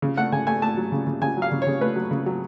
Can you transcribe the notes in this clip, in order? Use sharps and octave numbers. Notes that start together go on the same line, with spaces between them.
C#3
A3 F#5
C#3 G#5
A3 G#5
A3 A5
F#3
C#3
C#3
C#3 G#5
F#3
F5
C#3
C#5
C#3
A3 B4
F#3
C#3
F#3